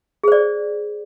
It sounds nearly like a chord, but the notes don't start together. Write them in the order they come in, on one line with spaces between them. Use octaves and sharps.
G#4 C5 D5